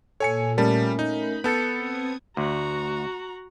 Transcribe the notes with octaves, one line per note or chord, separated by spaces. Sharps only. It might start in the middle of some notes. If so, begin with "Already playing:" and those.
A#2 A4 C#5 G#5 C#7
G3 A3 C#4 A#4 A5
D#4 B5
B3 A4 G6 A6 C#7
C4 D#6 G#6
D2 F#4 A#5